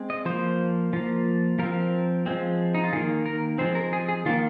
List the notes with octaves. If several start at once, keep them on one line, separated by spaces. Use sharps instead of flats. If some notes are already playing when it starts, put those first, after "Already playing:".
Already playing: G#3 C4
D#5
F3 A#3 C5
F3 A#3
F3 C4 A#4
F3 G#3 C4
D#4
F4
D#3 A#3 G#4
A#4
F3 G#3 C4 C5
A#4
G#4
G#4
D#3 A#3 F4